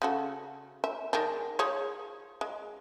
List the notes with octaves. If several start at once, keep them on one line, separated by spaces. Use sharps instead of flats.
C#3 F#4 A4
E5
D#3 G#3 D4
F3 G#4 C#5
G#3